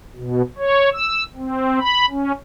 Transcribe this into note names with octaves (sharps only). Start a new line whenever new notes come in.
B2
C#5
E6
C4
B5
C#4